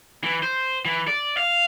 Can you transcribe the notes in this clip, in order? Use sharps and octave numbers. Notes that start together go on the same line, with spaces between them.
E3
C5
E3
D5
F5